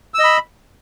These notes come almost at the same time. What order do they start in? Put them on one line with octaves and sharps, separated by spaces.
E6 D#5 B5